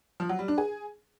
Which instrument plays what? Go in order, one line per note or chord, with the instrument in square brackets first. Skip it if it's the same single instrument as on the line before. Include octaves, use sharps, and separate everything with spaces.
[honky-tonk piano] F3
F#3
G3
D4
G#4